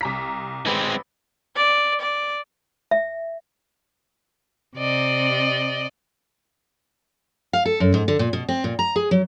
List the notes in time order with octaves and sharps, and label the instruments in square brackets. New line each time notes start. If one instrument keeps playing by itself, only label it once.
[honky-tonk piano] C2 A#5 B6
[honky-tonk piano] A1 B4 [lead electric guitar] G#3 C4
[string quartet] D5
D5
[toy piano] E5
[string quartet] C3 D5 D#5
[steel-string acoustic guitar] F5
A4
F#2
G#2
D3
A#2
B2
C4
A#2
A#5
G#4
F#3